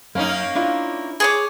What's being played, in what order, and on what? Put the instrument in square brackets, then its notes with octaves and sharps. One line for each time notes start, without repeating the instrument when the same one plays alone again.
[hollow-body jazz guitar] F#2 [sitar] A#3 C#4 D#4
[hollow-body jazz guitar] D4 E4 F4
[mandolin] G#4 C#5 D6